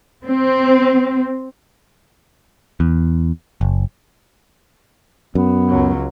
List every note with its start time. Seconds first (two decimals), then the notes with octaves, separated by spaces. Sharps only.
0.24 C4
2.80 E2
3.61 F#1
5.35 F#2 B3
5.68 C#2 F#3